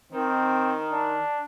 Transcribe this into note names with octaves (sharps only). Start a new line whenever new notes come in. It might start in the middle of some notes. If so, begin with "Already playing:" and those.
D#3 C4
D4